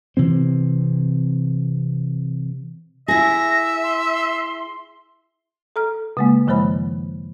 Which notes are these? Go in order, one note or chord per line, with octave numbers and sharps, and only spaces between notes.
C3 E3 C4
E4 G#4 E5 A#6
C6
A4 A#5 F6
C#3 G#3 A#3
F#2 D#3 F3 G#3 C5 B5